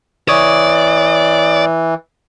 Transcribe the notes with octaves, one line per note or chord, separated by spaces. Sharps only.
E3 C#5 D5 D#6